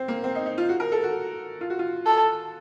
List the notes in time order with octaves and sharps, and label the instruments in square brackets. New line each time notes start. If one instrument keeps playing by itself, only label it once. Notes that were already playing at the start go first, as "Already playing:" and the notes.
Already playing: [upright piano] C4
A#3
C4
D#4
D#4
F4
F#4
A#4
A4
F#4
F4
F#4
F4
[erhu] A4